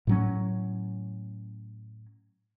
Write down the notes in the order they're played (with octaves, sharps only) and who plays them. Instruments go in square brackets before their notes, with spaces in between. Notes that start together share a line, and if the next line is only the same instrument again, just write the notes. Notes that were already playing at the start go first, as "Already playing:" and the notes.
[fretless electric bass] A2 F#3 C#4